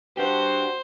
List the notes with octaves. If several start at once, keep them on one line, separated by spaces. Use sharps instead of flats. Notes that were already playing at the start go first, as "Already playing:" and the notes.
D4 F#4 G4 C5